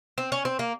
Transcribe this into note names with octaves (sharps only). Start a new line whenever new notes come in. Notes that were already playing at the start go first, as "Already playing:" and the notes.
C4
C#4
C4
A#3